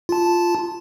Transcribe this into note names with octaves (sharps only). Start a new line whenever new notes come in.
F4 A5